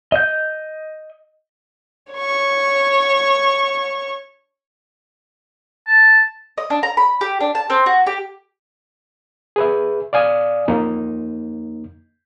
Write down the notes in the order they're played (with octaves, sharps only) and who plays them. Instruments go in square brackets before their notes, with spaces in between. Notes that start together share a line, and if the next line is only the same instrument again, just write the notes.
[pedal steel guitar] D#5 G6
[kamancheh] C#5 C#6
[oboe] A5
[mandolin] D#5
D4
A#5
B5
G4
D4
A5
C4
F#4
G4
[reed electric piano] G#4 B4 E5
D5 F5 G#5 D#6
F2 A#3 D#4